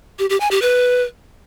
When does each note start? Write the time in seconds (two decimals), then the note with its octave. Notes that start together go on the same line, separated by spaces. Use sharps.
0.19 G4
0.30 G4
0.40 G#5
0.51 G4
0.62 B4